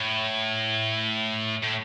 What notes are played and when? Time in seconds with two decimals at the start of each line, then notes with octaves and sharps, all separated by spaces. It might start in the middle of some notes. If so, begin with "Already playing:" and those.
Already playing: A2
1.63 A2